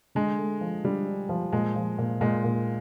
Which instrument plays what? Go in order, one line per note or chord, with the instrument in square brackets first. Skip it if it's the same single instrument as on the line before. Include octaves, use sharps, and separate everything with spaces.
[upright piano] D3 [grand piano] G#3
[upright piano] A3
F3
[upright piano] D3 [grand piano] G3
[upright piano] D4
F3
[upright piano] A#2 [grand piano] G#3
[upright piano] F3
A#2
[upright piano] A#2 [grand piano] G#3
[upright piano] A#2